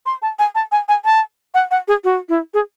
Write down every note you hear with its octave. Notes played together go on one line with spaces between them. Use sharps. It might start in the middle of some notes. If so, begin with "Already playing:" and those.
C6
A5
G#5
A5
G#5
G#5
A5
F#5
F#5
G#4
F#4
E4
G#4